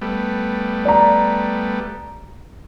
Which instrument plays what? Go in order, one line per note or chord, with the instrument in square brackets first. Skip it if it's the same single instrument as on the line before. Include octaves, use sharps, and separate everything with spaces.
[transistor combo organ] G3 A3 B3
[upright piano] D5 A#5